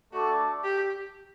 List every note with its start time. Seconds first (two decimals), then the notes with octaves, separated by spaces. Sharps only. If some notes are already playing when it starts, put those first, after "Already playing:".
0.12 A3 D4 F#4 A4 D5
0.64 G4